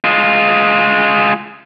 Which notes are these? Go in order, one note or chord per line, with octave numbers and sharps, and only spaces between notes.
G#3 F4